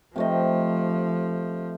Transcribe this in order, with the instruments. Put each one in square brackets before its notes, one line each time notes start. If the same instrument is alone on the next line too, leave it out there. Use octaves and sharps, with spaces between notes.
[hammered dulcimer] C3 A3 D#5 [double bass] F3